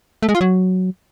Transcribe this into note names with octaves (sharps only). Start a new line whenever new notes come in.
A3
G#3
F4
F#3